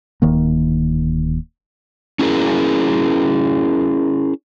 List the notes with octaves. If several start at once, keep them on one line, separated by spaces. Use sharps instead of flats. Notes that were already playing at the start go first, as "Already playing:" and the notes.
D1 D#3 A#3
C#4 E4 G#4 A#4